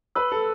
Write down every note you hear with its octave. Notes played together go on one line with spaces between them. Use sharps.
B4 E6
A4